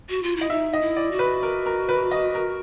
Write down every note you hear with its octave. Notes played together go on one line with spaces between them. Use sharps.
F#4
F4
E4 D#5
D#4 E5
D#5
E4
D5
F#4
B4
A#4
A#4
B4
D#5
A#4